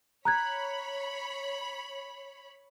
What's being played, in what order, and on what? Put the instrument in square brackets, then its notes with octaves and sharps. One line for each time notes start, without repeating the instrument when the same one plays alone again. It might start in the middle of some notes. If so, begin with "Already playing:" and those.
[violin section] C#5 B5 [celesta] A#5 F#6 G#6